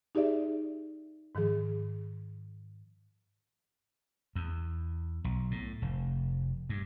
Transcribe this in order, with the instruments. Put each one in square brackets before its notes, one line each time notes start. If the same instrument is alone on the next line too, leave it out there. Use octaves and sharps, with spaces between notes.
[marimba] D#4 G4 G#4 D5 E5
G#2 D#3 F3 G#4
[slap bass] E2
B1
A2
F1
G2